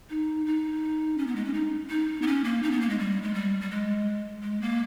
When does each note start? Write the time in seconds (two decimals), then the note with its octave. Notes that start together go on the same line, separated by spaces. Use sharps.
0.10 D#4
0.46 D#4
1.18 C#4
1.27 B3
1.36 G#3
1.45 C#4
1.54 D#4
1.90 D#4
2.22 B3
2.27 C#4
2.44 A#3
2.63 D#4
2.71 B3
2.81 A#3
2.89 G#3
2.99 G3
3.23 G#3
3.34 G3
3.61 G3
3.71 G#3
4.43 G#3
4.62 A#3